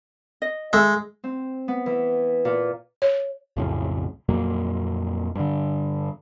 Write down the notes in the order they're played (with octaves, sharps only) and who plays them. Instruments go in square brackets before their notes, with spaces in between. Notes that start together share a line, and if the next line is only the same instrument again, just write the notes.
[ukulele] D#5
[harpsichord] G#3 [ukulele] A4 E5
[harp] C4
B3
E3
A#2
[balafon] C#5
[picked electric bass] B1 F2 A2 C#3
F2 A#2 F#3 A#3
G2 D3